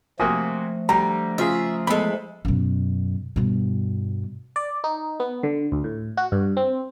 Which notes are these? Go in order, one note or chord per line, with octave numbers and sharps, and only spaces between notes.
C3 F3 A3 A#3 F#4 G#5 D#6
D3 G3 A#5
C#3 F4 G#4 E5
E2 G#3 A4 B5
F#2 B2
G2 B2
D5
D#4
B3
D3
D2
A2
F#4
G2
C4